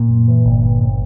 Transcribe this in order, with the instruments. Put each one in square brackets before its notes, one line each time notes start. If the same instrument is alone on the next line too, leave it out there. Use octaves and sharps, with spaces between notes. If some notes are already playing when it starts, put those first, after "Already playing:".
Already playing: [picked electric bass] A#2
[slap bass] F#2
E3
G1
G2
G1